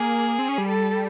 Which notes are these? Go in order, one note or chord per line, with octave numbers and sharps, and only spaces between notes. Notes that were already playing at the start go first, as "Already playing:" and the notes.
Already playing: A#3 G#4
C4
C#4
G3
A4